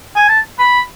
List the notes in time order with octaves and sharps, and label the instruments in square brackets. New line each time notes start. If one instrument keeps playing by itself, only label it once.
[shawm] G#5
A5
B5